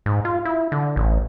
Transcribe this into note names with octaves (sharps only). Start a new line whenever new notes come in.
G#2
F4
E4
D3
A1